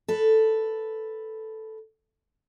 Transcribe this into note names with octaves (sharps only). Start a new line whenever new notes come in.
A4 B4